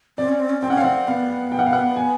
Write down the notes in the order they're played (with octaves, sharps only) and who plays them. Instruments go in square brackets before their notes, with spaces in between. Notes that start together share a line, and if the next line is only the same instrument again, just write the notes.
[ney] C4 [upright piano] D5
[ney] C#4
C4
C#4
[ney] C4 [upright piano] G5
[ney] C#4 [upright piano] F#5
[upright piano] F5
[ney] C4 [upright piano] F#5
[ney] B3 [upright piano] F5
[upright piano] G5
F#5
F5
F#5
G#5